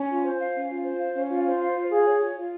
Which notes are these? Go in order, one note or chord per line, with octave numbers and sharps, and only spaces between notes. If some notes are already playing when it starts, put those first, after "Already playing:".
Already playing: C#4
F4
C5
F5
C#4
F4
C5
F5
C#4
F4
C5
F5
F4
G#4
C#5
F4
F4